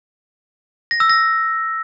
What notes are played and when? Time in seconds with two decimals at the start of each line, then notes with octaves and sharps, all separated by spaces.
0.91 A#6
1.00 E6
1.09 A#6